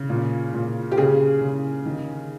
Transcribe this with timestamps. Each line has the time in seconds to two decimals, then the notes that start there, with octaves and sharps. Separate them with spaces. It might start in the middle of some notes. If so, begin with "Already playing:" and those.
Already playing: C#3
0.10 A#2
0.54 A#2
0.92 G4
0.97 C#3 G#4
1.41 C#3
1.86 D#3